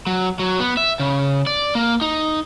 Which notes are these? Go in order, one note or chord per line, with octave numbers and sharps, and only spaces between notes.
F#3
F#3
B3
E5
C#3
D5
A#3
D#4